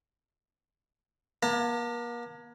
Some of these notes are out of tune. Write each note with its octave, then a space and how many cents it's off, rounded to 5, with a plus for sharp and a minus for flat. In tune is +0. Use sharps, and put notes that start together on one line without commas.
A#3 +40 A5 +45